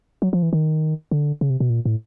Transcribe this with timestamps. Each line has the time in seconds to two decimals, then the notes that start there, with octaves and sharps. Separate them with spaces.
0.22 F#3
0.33 F3
0.43 E3
0.53 D#3
1.11 D3
1.41 C#3
1.50 C3
1.60 B2
1.70 A#2
1.85 A2